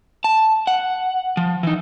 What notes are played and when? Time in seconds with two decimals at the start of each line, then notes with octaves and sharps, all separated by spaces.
0.24 A5
0.67 F#5
1.37 F3
1.63 E3 D#4